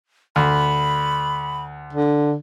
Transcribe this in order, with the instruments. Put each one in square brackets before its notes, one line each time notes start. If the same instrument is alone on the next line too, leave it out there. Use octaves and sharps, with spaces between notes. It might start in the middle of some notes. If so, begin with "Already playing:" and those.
[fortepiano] D2 [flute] B5
[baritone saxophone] D3